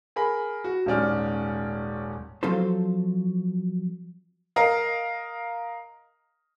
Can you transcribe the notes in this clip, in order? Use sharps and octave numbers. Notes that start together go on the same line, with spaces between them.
G#4 A#4 B5
F#4
D#1 G#2 C#4 D5 F6
F3 F#3 C4 F4 A4 C5
A#4 D#5 F5